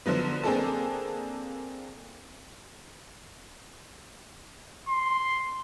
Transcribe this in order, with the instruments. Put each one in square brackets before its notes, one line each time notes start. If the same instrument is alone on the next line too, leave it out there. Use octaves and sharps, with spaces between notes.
[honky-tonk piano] D3 F3 F#3 B3
A#3 C4 D4 G#4 A4 A5
[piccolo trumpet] C6